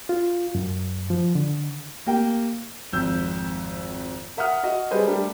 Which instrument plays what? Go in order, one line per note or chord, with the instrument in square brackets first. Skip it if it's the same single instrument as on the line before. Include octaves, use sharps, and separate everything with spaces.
[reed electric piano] F4
F#2
F3
D3
[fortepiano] A#3 G4 G5
[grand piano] G#1 F2 E6 G6
A#4 E5 F#5 D#6 F6
F#4 D#5
G3 G#4 B4 C5 D#5
G3 A3 D4 G4 A#4